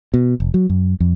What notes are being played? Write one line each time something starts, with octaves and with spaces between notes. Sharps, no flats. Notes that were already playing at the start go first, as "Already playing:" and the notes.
B2
F1
F#3
F#2
F2